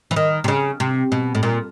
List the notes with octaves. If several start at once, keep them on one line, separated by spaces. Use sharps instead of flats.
E3
D#3
C3
C#3
C3
B2
A2
A#2